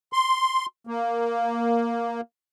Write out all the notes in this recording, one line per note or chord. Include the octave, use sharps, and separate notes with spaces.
C6
A#3